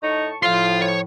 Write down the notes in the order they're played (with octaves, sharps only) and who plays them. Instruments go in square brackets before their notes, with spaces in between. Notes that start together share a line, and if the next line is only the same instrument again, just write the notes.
[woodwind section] A2 A5 C#6 [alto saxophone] D#4
[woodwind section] A2 F3 [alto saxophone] F4 [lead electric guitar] F5 C6
[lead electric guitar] C#5